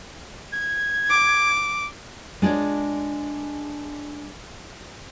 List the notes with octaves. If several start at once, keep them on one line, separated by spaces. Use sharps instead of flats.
G#6
D6
G#3 D4 F4 C#5 D5